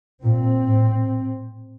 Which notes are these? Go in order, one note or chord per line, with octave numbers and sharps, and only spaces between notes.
A#2 C4
A2